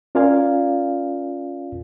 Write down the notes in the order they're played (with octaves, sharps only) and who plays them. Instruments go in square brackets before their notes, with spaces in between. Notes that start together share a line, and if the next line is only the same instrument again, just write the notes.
[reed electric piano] C#4 F4 A#4 D5 F5 G#5